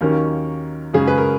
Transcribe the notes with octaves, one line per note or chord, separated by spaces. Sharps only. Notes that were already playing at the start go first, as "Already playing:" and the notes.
D#2 D#3 F#3 A#3 C#4 A#4
F#2 C#3 G#3 C#4 G#4
B4
A#4